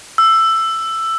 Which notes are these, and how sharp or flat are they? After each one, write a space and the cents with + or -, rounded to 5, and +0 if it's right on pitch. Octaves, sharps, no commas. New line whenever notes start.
E6 +10